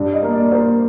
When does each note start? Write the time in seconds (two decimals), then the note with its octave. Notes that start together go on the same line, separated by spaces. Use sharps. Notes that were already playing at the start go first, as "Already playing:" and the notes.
Already playing: G2
0.13 D#5
0.23 A#3
0.33 D5
0.52 A#3 C5